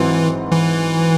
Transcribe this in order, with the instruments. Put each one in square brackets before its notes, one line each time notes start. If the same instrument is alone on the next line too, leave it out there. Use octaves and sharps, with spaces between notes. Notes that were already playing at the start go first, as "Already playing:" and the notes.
Already playing: [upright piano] G#2 F#3 C4 E4 [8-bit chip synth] E3
[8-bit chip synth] E3